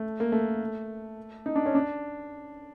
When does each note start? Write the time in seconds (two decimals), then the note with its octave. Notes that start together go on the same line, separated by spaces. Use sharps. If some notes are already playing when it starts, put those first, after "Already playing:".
Already playing: A3
0.20 A#3
0.32 A3
1.46 D#4
1.56 D4
1.66 C#4
1.75 D4